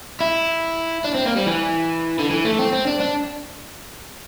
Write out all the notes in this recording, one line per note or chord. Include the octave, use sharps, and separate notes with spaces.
E4
D4
C4
A#3
G3
E3
D3
E3
A3
C4
C4
D4
D4